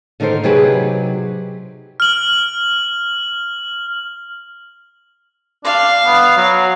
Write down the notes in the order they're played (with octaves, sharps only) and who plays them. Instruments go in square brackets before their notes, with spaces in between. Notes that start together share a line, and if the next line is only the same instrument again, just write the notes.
[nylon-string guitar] D3 D#3 D#4 A4 C5
C3 F#3 D#4 G4 G#4 B4
[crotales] F6 F#7
[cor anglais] D4 [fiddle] F5
[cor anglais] B3
F#3